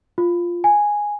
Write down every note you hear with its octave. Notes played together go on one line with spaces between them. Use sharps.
F4
G#5